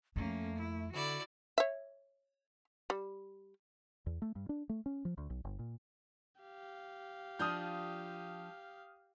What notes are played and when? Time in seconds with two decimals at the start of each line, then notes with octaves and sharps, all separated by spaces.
0.16 F2 A3 A#3 C#4
0.57 E4
0.93 D3 E4 F#4 D5
1.58 C#5 E5
2.90 G3
4.06 E2
4.22 A3
4.36 G2
4.49 D4
4.69 A3
4.86 C#4
5.05 F3
5.18 D2
5.30 B1
5.45 G1
5.59 A#2
6.41 G4 F5
7.39 F3 D4 F4 D#6 F6 G6